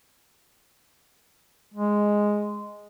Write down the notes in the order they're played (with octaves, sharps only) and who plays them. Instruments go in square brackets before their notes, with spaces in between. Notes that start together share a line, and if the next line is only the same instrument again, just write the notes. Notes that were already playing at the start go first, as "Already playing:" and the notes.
[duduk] G#3